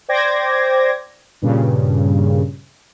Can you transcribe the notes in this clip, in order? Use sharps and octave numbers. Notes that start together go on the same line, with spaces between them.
C5 D5 G5 D6 G#6 A#6
G2 A#2 C#3